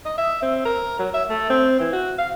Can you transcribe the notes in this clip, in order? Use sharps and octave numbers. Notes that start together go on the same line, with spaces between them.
D#5
E5
C4
A#4
F#3
E5
A3
C4
E3
F#4
F5